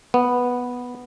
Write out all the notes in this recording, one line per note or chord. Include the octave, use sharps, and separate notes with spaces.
B3